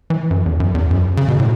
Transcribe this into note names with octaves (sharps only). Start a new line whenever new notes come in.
E3
F#2
E2
F#2
E2
F#2
C#3
B2
A2